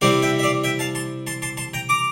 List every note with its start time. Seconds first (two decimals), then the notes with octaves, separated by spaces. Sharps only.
0.01 C3 G3 C4 E4 D5 F5
0.22 E5 G5
0.39 E5
0.43 D5 F5
0.64 E5 G5
0.79 F5 A5
0.95 A5 C6
1.27 A5 C6
1.42 A5 C6
1.57 A5 C6
1.74 G5 A#5
1.89 A#5 D6